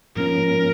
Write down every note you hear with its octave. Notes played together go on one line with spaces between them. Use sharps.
G#2 F3 A#3 C#4 A#4